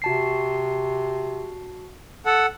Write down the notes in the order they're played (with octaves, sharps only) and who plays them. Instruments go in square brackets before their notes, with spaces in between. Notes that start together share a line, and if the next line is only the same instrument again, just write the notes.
[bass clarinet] C3 [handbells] F#4 A5 C7
[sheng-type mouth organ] A4 F#5